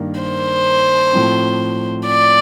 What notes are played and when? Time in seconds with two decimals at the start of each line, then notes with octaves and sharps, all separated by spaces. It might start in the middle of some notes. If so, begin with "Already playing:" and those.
Already playing: G2 D#3 A#3
0.21 C5
1.13 A2 F3 C4
2.06 D5